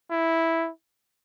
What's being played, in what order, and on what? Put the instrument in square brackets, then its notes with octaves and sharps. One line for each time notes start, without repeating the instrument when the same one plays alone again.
[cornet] E4